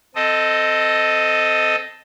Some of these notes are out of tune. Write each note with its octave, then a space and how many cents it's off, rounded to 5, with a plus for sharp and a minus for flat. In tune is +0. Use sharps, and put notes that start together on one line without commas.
C4 -15 A4 +0 D#5 +0